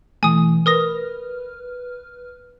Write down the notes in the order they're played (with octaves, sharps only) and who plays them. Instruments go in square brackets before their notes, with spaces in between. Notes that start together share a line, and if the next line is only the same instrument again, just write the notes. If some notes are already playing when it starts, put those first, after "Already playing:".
[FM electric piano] B2 E3 A3 [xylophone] G#5 D#6
[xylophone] A#4 D#6 A#6 [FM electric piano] B4 F6